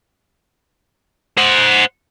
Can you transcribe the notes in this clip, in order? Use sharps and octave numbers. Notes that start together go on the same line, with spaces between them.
C5 F#5